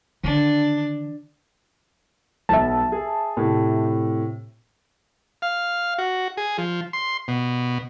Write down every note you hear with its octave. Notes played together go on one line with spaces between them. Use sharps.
D3 D#3 D4
B1 B3 E5 A5
G#4
A2 C3
F5
F#4
G#4
F3
C6
B2